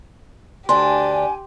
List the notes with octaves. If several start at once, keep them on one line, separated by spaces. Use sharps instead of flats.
D2 D4 G4 G#5 C6